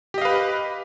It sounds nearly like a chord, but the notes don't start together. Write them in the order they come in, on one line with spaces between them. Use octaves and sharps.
G4 D#5 F5 B4